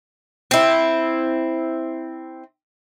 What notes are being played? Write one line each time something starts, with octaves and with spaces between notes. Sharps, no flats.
C4 E4